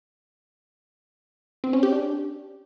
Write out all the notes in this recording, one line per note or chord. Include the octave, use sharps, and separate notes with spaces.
C4
C#4
G4
D4